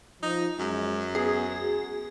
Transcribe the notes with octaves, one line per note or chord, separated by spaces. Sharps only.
F3 D#4
F#2 G#3
B3 G#4
F#4